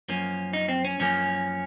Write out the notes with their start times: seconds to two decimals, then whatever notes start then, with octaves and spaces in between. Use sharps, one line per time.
0.08 F#2 F3 A#3 C#4
0.53 D#4
0.69 C4
0.85 C#4
0.99 F#2 F3 A#3 C#4